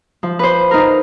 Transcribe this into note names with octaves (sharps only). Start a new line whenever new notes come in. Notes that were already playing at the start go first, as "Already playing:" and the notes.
F3
B4 C5
D#4 A#4